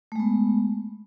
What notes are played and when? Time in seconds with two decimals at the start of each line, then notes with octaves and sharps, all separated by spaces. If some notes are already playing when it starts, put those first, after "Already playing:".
0.12 A3
0.16 G#3
0.19 B3